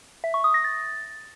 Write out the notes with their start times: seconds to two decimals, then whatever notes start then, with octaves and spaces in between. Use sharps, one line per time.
0.24 E5
0.34 C#6
0.44 D#6
0.54 A#6
0.64 A6